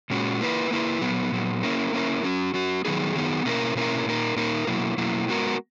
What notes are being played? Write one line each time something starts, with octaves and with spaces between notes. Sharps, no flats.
A#2 G#3 C#4 F#4
A#3 E4 B4
A#3 E4 B4
A#2 F#3 B3
A#2 F#3 B3
A#3 C#4 E4 A#4
A#3 C#4 E4 A#4
F#3 C#4 F#4
F#3 C#4 F#4
D#3 F#3 B3 D#4 G#4
D#3 F#3 B3 D#4 G#4
B2 A#3 C#4 E4 A#4
B2 A#3 C#4 E4 A#4
A#2 A#3 D#4 A#4
A#2 A#3 D#4 A#4
B2 F#3 A#3 E4
B2 F#3 A#3 E4
G#3 B3 F#4 A#4